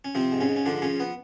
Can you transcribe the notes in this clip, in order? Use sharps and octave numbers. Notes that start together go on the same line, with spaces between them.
C#4
C3 F3 C4
G#2
C#3 C#4
G#2
C#4
D3 F3 D4
C#3 F3 C#4
B3